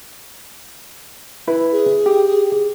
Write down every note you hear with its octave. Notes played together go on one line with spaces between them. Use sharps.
E4 B4
G#4
G4